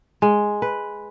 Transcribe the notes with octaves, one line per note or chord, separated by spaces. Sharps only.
G#3
B4